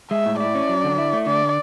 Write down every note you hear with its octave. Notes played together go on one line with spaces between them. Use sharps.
G#3 E5
A2
E4 D5
C#4
F#3
D3
E4
A3
D3 D5